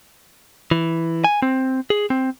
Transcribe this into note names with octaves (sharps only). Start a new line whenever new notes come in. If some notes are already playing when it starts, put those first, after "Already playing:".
E3
G#5
C4
G#4
C4